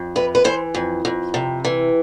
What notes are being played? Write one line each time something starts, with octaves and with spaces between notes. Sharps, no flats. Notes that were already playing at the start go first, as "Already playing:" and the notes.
Already playing: F2
C3 B4
B4
E3 C5
F2
F2
C3
E3